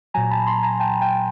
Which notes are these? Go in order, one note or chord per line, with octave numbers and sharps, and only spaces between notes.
A#2 F#3 G#5 A#5
A5 B5
A#5 C6
G#5 A#5
G5 A5
G5 A5